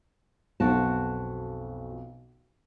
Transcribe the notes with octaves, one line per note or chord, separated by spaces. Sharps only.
B1 F2 F#4 A5